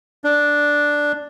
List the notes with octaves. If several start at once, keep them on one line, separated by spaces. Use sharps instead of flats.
D4